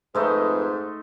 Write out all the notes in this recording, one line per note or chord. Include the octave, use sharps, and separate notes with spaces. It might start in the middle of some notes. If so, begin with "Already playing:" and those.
F2 G#2 G#3 A3 D#4 B4